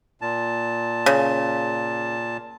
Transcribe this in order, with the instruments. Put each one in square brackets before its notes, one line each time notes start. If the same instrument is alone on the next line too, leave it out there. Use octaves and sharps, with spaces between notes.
[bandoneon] A#2 A5
[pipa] C#3